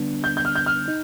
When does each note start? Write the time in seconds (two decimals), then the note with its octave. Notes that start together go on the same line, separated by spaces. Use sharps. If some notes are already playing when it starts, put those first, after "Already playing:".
Already playing: D3 G3 B3 D4
0.24 G6
0.37 G6
0.45 F6
0.56 G6
0.66 F6
0.88 D#4